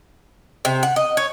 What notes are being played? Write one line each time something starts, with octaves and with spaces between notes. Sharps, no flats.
C3
F#5
D#5
C#5